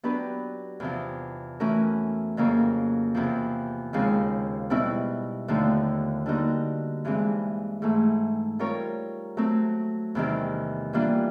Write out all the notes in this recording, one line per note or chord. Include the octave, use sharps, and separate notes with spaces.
F#3 B3 D4 G4 B4
E2 C3 F3
E3 A3 C#4 F#4 A#4
F2 C#3 F#3 A#3
E2 C3 F3
D#2 C#3 F3 G#3 C4
B2 G3 C4 E4
D#2 D3 F3 A3
D3 G3 A#3 D#4 F#4
G2 E3 G#3 C4
G#2 E3 A3
G3 C4 F4 A#4 C#5
F#3 A3 C4
E2 C3 D#3 G3
E3 G3 A#3 D4 F4